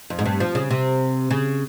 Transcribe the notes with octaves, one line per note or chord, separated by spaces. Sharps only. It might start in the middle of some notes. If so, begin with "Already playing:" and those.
F2
G#2
G2
F3
C#3
C3
C#3